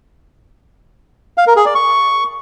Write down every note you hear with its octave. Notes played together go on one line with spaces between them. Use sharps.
F5
A#4
G#4
D5
C#6